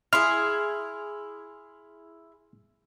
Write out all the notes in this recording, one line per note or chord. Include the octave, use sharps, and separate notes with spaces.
E4 G#4 C6 F6